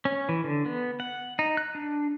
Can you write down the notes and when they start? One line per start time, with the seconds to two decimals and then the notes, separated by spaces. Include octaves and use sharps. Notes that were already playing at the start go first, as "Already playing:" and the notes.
0.05 C#4
0.29 E3
0.44 D3
0.66 B3
1.00 F#5
1.39 D#4
1.57 F#6
1.75 D4